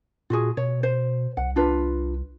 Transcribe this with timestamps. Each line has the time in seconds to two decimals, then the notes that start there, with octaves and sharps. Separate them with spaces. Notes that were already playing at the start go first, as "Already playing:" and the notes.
0.30 A#2 F4 F#4 G#4
0.57 B2 C#5
0.83 C5
1.37 C2 F#5
1.56 D4 F4 B4